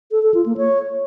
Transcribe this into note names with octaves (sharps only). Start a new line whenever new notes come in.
A4
A4
F4
A#3
C#5